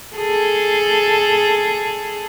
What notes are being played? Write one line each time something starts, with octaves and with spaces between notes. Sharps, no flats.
G#4 A4